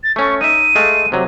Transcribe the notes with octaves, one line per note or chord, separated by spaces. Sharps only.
A6
A3 C#4 C#6
D#4 E5 D#7
G#3 A3 F5
C3 F#3